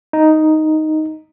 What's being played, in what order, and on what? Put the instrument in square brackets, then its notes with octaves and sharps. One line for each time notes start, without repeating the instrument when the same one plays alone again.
[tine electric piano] D#4